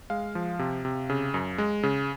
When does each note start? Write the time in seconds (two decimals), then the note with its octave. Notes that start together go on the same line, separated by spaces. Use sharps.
0.10 G#3 F5
0.35 F3
0.59 C3
0.85 C3
1.10 C#3
1.34 F#2
1.58 G#3
1.83 C#3